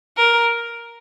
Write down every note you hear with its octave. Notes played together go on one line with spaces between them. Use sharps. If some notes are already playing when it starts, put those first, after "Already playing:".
A#4